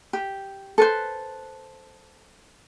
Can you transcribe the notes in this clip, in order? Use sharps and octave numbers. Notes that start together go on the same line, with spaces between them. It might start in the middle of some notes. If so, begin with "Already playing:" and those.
G4
A4 B4 C5